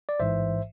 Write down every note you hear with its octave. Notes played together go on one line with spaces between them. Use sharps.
D5
A1 G#2 E3 C5 E5